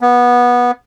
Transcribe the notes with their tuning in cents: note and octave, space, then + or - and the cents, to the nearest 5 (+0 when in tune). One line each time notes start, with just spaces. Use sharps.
B3 -15